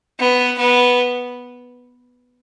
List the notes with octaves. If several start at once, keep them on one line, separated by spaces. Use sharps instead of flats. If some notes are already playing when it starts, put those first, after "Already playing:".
B3
B3